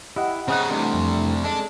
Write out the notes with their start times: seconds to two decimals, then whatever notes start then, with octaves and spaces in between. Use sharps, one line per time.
0.16 E4 G4 D#5 F#5
0.48 C#3 C4 D#4 G#4 F#6
0.69 C2 C3 E3 A3 D4
0.94 F2
1.44 G#3 D4 A4